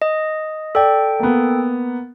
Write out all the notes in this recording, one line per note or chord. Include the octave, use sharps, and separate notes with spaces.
D#5
A4 D5 G5
A#3 B3